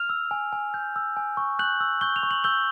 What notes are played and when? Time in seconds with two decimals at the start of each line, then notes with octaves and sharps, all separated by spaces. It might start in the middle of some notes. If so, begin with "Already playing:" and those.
Already playing: F6 F7
0.09 E6
0.31 G#5
0.52 G#5
0.74 G6
0.96 E6
1.17 G#5
1.37 C#6
1.59 F#6 G6 F#7
1.80 E6
2.01 C#6 G6 G7
2.16 F7
2.23 C#6
2.31 F#7
2.44 E6 G6 G7